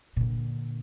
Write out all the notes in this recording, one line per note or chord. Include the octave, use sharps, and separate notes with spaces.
A#2 D3